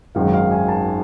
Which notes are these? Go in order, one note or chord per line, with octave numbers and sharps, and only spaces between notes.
G#1 F#2 D#3 G#3 F5
F5
G#5
A5